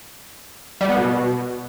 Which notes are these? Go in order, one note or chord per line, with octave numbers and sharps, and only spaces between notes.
G3
B3
B2